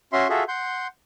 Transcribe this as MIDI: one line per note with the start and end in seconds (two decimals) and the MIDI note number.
0.13 0.28 61
0.13 0.28 66
0.13 0.28 76
0.13 0.28 84
0.29 0.44 65
0.29 0.44 66
0.29 0.44 68
0.29 0.44 69
0.29 0.44 76
0.48 0.87 78
0.48 0.87 84
0.48 0.87 91